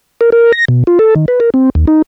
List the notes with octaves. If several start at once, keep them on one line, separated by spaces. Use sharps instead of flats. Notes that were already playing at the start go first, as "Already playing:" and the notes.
A#4
A#4
A#6
B2
F4
A4
D#3
B4
A#4
C4
D#2
D#4